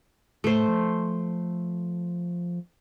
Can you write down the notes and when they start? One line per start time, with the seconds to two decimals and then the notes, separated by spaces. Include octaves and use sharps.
0.44 A2 A3 C5
0.68 F3